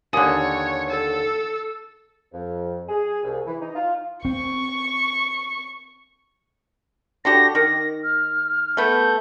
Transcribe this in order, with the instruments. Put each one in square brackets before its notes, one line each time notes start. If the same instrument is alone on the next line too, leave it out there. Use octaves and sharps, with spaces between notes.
[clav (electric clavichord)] D#2 D3 [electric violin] C#5 [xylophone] G#5 D#6
[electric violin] A4 E6
[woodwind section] F2
G#4
C2
E3
D#4
F4
[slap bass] C4 [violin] C#6
[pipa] D3 F#4 G4 [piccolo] A#6
[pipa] D#3 [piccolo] A#6
[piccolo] F6
[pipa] A3 B3 [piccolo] G6